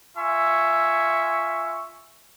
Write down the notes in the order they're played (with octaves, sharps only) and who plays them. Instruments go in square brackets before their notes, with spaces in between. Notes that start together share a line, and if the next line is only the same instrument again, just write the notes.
[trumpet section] F4 E5 G#5 C#6